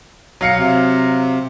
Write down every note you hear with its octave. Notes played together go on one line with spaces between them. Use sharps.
F#3 F5 C#7
C3